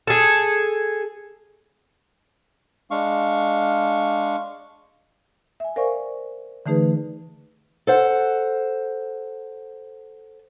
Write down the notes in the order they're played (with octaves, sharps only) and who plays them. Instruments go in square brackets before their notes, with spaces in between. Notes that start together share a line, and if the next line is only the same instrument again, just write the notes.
[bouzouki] G#4 A4
[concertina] G#3 D4 F5 C#6
[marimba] E5 G#5
A#4 C5 D5 F5 G#5 C#6
D3 E3 A3 D#4 G#4 B4
[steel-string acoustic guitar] A4 C5 F#5